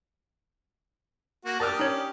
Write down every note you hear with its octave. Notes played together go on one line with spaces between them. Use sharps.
A#3 F#4
D4 G4 A#4 A5 D#6 F6
C#4 D#4 C#5